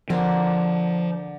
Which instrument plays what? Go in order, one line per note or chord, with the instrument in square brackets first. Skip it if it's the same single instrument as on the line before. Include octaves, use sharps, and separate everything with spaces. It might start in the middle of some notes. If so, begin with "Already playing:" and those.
[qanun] D3 A#3 C4 [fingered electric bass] F3